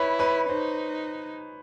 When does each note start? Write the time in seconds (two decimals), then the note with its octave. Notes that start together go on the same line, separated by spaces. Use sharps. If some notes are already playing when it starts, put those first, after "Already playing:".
Already playing: E4 B4 C#5
0.19 B4 C#5
0.49 D#4 C5